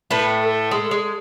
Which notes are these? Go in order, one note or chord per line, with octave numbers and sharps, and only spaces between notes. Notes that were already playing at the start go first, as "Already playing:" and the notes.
A2 A3 B4
A4
G#3
G#3